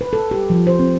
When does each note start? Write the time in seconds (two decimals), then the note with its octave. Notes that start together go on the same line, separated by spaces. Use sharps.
0.01 B4
0.13 A4
0.31 G4
0.50 F3
0.67 C5
0.79 C4